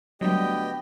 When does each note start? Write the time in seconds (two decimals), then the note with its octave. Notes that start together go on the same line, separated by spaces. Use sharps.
0.21 D2 F#3 G3 B3 G4 D#5 G5